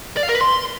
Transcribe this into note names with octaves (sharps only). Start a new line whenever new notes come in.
D5
F5
A#4
B4
C6